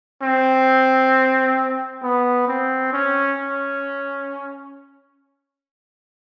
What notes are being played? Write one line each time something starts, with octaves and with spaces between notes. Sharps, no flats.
C4
B3
C4
C#4
C#4